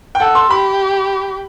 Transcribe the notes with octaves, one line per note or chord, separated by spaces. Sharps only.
G5
A4 F#5
C6
G4 B5